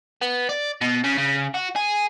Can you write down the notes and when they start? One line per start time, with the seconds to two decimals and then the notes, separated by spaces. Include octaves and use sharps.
0.21 B3
0.49 D5
0.81 B2
1.04 C#3
1.18 C#3
1.55 F#4
1.76 G#4